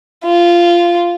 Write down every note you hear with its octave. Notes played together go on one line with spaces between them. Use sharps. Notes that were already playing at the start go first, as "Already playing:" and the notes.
F4